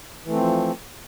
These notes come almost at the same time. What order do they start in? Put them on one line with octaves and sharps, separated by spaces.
E3 A3 C4 F3